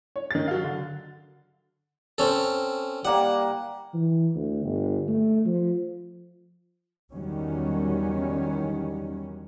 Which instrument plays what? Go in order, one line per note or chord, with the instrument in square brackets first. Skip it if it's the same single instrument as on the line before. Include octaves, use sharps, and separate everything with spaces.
[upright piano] C#5
D#3 A6
F#3 F5
D3
[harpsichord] C4 C#4 A4
[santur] G3 A#3 [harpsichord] F#5
[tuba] E3
D2
G1
A3
F3
[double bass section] E2 D#3 F#3 G3 C#4